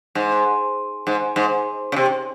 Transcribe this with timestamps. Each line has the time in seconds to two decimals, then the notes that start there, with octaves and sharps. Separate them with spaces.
0.15 G#2
1.07 G#2
1.36 G#2
1.92 C#3
1.96 C3